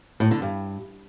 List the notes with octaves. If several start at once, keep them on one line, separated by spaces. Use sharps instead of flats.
A2
D3
G2